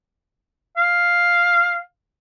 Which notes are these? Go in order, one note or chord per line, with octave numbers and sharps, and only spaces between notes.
F5